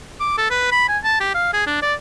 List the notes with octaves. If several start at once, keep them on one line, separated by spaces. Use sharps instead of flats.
D6
A4
B4
B5
G#5
A5
G4
F5
G#4
D4
D5